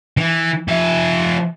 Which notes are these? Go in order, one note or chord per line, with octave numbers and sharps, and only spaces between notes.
E3
F3 E5